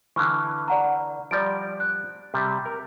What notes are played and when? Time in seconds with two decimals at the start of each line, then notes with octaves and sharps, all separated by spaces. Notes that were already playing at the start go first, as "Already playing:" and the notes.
0.16 D3 E3 C#6 F6
0.68 D5 F#5 A#5
1.31 F3 G3 D5 A#5 A6 D7
1.80 F#6
2.34 C3 G3
2.66 A#4